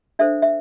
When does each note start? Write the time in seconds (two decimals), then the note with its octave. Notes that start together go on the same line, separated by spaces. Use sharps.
0.19 D4 A4 C5 E5
0.42 E5